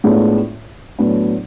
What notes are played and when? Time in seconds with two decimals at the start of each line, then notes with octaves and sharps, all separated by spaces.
0.04 A2 G#3 B3 D4 F4
0.99 A2 F#3 B3 D4